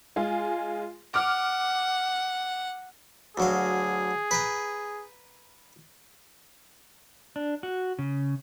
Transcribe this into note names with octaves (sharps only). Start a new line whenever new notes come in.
G#3 F4 G#4
F#5 D6 F6
D2 F#3 G#4 F5
B4 G5 A#5
D4
F#4
C#3